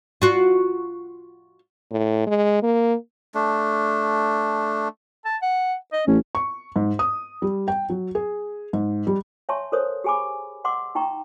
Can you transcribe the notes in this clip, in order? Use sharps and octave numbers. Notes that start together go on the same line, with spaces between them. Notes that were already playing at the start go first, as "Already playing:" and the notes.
F4 F#4
A2
G#3
A#3
A3 D4
A5
F#5
D#5
A1 C#4
C#6
G#2
D#6
G3
G5
F#3
G#4
G#2
G3
C#5 E5 G#5 A5 C6 C#6
A4 A#4 C5 C#5 D#6
G4 G#4 G#5 B5 D6
D#5 F#5 C6 D6 E6
D#4 G5 A#5 C#6